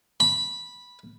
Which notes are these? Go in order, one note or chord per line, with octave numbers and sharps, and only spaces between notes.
B5